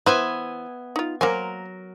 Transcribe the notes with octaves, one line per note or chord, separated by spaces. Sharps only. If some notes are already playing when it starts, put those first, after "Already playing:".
E3 B3 B4 C5 E5 G#5
D#4 F4
F#3 A#3 A#4 C5 G#5